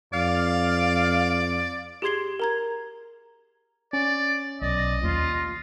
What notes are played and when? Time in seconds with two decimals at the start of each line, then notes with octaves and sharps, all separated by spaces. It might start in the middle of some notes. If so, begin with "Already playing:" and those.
0.13 F2 D5 F5
2.02 G4 G#4 C6 G#6 C7 G7
2.40 A#4 A#5 G#6
3.93 C#4 D5
4.62 B1 D5 D#5
5.03 D#2 E3 F4